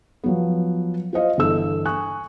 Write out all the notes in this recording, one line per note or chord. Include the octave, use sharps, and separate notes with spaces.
F3 F#3 B3
F4 C5 D#5 F5
G1 E3 A4 E6
G#5 C#6 D#6 F#6